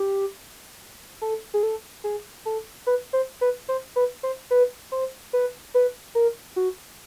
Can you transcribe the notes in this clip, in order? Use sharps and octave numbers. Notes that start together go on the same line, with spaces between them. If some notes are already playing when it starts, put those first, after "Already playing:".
Already playing: G4
A4
G#4
A4
G#4
A4
B4
C5
B4
C5
B4
C5
B4
C5
B4
B4
A#4
F#4